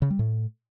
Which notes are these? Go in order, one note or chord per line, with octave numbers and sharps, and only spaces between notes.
C#3
G3
A2